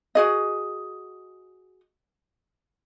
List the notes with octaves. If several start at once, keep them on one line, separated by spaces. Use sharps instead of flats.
F#4 G#4 D#5